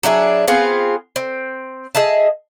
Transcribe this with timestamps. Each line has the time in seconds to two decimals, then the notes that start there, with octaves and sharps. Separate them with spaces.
0.03 F#3 D4 E4 G#4
0.48 B3 C4 F4 G#4
1.16 C4
1.95 G#4 D#5 E5 A5